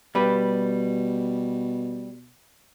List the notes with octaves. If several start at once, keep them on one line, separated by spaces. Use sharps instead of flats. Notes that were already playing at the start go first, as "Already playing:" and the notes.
B2 G3 G4 B4